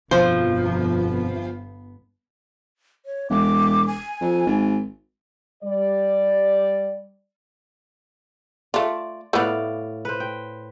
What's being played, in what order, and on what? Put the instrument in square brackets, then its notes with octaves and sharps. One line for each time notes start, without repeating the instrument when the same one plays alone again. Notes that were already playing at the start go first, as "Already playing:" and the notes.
[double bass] G1 B3 [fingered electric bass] F2 B2 [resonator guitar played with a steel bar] F3 [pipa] C5
[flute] C#5
[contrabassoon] E1 [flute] D6
[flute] G#5
[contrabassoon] F2
G#1
[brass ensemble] G3 D5
[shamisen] A3 F4 [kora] D5
[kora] A2 D5 F5 [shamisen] A3 B3
[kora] B4 C5
G5